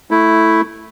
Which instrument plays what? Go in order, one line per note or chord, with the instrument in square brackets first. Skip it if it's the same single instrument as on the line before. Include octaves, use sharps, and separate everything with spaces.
[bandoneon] A3 E4